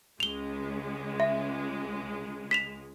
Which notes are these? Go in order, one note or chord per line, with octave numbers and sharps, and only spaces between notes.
C#2 G#3 F7 G7
E5
B6 E7 F7